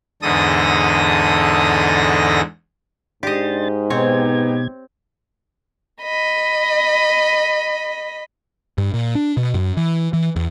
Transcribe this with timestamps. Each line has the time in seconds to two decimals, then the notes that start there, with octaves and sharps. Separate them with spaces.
0.22 E2 G#2 D3 A4 D#6 A#6
3.23 G#2 D4 G4 D#5 C6 A6
3.90 B2 B3 C4 D#4 G4 C#5 G#6
6.02 D#5 B5
8.78 G2
8.94 A#2
9.15 D4
9.37 B2
9.54 F#2
9.77 E3
10.13 E3
10.36 E2